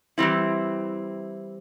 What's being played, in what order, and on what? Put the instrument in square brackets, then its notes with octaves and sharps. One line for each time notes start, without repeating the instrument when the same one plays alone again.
[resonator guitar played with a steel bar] E3 G3 C4 E4